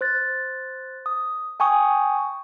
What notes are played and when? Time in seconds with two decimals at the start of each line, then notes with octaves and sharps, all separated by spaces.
0.01 C5 F#6 A6
1.06 D#6
1.60 G5 G#5 C#6 D#6